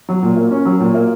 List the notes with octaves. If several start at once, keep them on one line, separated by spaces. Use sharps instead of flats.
F#3
A#2
A#3
C#4
F#3
A#2
A#3